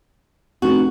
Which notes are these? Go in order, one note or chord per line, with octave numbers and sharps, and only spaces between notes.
F1 F#4